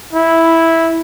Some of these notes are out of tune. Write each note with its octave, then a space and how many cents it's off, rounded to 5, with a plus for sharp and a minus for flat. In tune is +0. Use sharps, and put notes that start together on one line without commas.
E4 -5